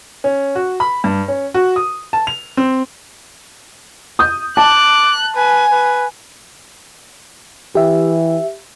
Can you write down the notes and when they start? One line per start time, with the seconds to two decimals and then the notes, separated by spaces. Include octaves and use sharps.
0.24 C#4
0.55 F#4
0.80 B5
1.04 G2
1.28 C#4
1.54 F#4
1.76 D#6
2.13 A5
2.27 F7
2.57 C4
4.19 D#6 G6
4.57 A5 D6 F#6
5.36 B4 G#5
5.72 B4
7.75 E3 G4 E5